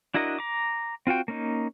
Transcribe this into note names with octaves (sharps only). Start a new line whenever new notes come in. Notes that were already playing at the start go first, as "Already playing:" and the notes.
D4 E4 F#4 A#4 D#5
A#5 D6
C4 F4 F#4 G5
A#3 C#4 D#4